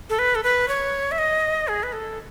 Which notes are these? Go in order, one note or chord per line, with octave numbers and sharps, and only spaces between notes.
A4
B4
A4
B4
C#5
E5
D#5
G#4
B4
A4